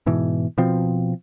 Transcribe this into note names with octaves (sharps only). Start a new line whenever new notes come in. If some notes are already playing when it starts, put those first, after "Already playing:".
G#2 B2 E3
B2 F3 C4